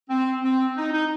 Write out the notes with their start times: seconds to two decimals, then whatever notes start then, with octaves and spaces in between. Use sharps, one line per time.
0.09 C4
0.43 C4
0.76 D#4
0.93 D#4